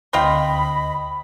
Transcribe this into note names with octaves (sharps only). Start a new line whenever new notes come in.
D2 C4 F4 D#5 G5 B5 A#6